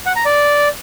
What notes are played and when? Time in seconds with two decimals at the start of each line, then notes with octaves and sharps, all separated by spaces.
0.06 F#5
0.16 A#5
0.25 D5